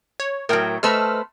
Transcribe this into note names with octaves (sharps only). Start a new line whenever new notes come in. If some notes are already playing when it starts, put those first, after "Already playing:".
C#5
A2 F#3 A#4 G5
A3 B4 C5 D#5 E6 F6